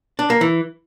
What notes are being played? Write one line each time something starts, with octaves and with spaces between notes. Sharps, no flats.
D4
A#3
E3